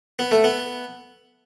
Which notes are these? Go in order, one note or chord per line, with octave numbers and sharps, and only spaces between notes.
B3
A3
B3